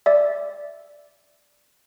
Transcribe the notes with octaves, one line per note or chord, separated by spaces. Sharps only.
D5 E5